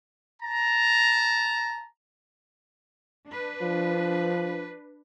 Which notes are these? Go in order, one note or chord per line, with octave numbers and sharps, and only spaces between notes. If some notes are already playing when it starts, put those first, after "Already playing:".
A5 A#5
D4 B4
F3